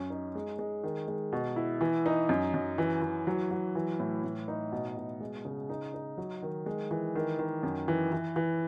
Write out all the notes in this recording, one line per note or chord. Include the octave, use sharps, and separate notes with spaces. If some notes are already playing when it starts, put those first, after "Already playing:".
Already playing: F#2 C#4
D#4
G#3
G#3
D#3
G#3
B2
E4
E3
D#4
F#2
F#2
E3
E3
F#3
F#3
E3
A2
A2
D#4
B2
B2
G#3
C#3
D#4
D#4
F#3
D#3
G#3
E3
D#3
D#3
F#2
E3
E3
E3